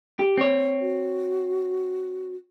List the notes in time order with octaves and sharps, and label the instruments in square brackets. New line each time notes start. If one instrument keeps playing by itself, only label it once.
[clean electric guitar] G4
C4 C#5
[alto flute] F#4